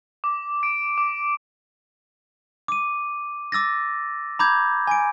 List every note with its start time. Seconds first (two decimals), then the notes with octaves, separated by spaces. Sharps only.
0.24 D6
0.63 D7
0.98 D6
2.68 D6 D#7
3.52 D6 E6 A6 A#6
4.39 A#5 B5 D6 G6 G#6
4.87 G#5 D7